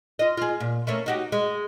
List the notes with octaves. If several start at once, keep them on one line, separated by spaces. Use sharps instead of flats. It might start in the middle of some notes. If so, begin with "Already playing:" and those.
F4 D#5
F4 G#4
A#2
A3 A#3 C#4
D#4 F#4 G4
G#3